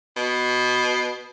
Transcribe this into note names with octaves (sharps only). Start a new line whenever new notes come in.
B2